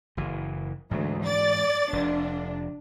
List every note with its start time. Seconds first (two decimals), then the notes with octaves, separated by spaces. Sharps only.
0.17 F#1 E3
0.91 D2 G#2 E3 F#3
1.25 D5 A6
1.93 F1 C3 D4